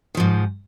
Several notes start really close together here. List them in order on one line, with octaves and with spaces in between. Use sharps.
D#3 F3 G#2